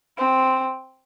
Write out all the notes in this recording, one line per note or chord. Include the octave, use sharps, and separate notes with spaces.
C4